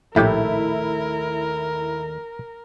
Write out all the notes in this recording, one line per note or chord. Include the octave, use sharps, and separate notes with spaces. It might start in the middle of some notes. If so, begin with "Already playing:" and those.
A#1 D#2 A2 A3 E4 G4 A#4